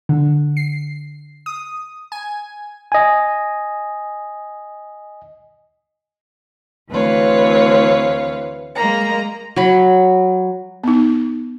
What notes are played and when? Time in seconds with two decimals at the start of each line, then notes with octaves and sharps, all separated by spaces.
0.09 D3
0.57 C7
1.46 D#6
2.12 G#5
2.92 D#5 G#5
6.90 D2 E3 C4 B4 C#5 F5
8.75 G#3 A#3 A#5
9.56 F#3 B5
10.84 B3 D#4